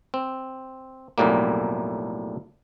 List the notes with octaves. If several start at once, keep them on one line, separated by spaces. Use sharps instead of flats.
C4
B1 F2 A2 G3 A#3